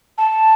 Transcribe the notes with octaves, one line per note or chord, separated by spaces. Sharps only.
A5